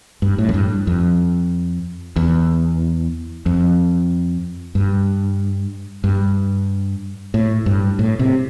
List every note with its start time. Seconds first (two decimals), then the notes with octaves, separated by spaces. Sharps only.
0.22 G2
0.38 A2
0.49 F2
0.54 G2
0.87 F2
2.16 E2
3.46 F2
4.75 G2
6.04 G2
7.34 A2
7.66 G2
7.99 A2
8.19 C3